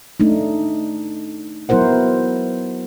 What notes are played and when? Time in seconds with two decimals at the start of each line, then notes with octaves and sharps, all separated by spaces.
0.20 A3 D4 D#4
1.69 F#3 B3 E4 A#4 C5 F#5